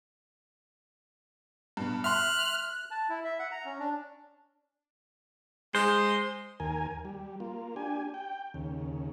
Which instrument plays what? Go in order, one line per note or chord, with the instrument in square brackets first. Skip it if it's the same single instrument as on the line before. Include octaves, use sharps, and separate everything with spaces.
[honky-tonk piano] G2 B2
[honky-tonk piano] E5 C6 [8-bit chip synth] F6 F#6
[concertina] F#6
A5
E4
E5
F#5
A#5
C#4
D4
[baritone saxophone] G#3 [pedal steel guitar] C5
[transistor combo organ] D#2 A#4 G#5
G3
A#3 F4
D4 G4 G#5
G5
D#2 C#3